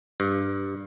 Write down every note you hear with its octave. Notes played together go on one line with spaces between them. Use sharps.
G2